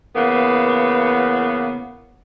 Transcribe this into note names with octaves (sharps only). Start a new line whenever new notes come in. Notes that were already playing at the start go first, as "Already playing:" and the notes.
C#3 E3 A#3 B3